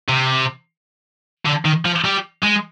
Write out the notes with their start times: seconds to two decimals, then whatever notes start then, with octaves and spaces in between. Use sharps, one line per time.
0.09 C3
1.45 D3
1.65 D#3
1.85 F3
2.05 G3
2.44 G#3